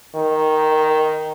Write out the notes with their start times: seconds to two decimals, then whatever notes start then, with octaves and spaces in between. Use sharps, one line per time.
0.15 D#3